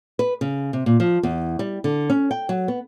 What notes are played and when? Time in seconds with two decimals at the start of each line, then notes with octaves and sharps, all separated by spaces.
0.19 B4
0.41 C#3
0.73 C3
0.86 A#2
1.00 F3
1.23 E2
1.59 G3
1.84 D3
2.10 C#4
2.31 G5
2.49 F#3
2.68 B3